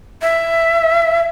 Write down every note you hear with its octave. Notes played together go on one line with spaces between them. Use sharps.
E5